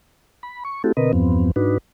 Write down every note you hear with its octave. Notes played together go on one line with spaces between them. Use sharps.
B5
C#6
A3 C4 E4 F#4 G4 A4
B2 D3 C4 A#4 B4 D#5
E2 G2 F3 B3 C4
G#2 D4 D#4 F#4 B4